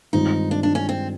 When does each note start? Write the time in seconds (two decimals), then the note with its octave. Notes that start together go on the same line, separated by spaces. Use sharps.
0.13 G2 D#3 G#3 C4 D#4 F4
0.51 D4
0.63 D4
0.75 C#4
0.89 C4